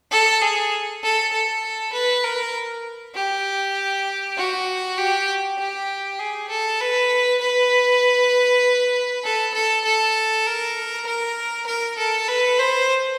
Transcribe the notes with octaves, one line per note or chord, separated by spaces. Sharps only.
A4
G#4
A4
A4
B4
A#4
G4
F#4
G4
G4
G#4
A4
B4
B4
A4
A4
A4
A#4
A#4
A#4
A4
B4
C5